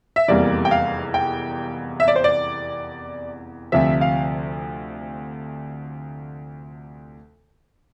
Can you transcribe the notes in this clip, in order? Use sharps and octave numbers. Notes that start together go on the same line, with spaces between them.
E5
F1 E2 C3 G3 A#3 D5
G5
F5
G5
E5
D5
C5
D5
D2 C3 F3 E5
F5